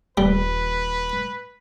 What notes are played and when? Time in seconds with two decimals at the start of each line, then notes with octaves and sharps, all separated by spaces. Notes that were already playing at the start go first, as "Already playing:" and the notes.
0.18 D#1 G3 B4